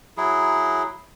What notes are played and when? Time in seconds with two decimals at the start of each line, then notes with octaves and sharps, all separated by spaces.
0.17 F#3 E4 G#4